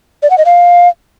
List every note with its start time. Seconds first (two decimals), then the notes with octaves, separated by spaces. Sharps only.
0.23 D5
0.30 F#5
0.38 D#5
0.46 F5